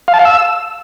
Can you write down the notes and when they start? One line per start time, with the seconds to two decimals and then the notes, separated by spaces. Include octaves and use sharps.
0.08 F5
0.14 A5
0.19 F5
0.25 E6